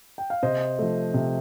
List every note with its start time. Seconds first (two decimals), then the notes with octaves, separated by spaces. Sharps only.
0.18 G5
0.30 F5
0.43 C3 C5 D#5
0.79 F3 A3
1.14 C3